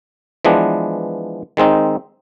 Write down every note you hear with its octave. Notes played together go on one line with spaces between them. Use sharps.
E3 F3 G#3 B3 D4
D#3 G#3 C4 D#4